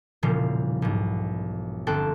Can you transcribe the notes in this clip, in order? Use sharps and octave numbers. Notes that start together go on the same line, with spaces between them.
E1 A#2 C#3 F3 G3 F4
B1 G#2
G1 C4 A4 G5 A5 F#6